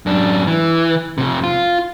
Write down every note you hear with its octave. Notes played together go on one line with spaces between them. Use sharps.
F#2 D4
E3
F2 C3
F4